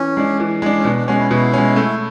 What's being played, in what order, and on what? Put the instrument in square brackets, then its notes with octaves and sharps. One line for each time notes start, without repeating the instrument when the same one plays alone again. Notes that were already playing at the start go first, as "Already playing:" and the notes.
Already playing: [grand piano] E3 [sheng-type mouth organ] C#4
[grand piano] G#3 D4
E3
G#3 D4
[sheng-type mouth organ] C#4
[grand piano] B2 [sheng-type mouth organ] D4
[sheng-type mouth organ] D4
[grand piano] G#3 C#4 [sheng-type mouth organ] F#4
[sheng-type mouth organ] E4
[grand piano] B2 [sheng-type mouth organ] E4
[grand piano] G#3 C#4
A3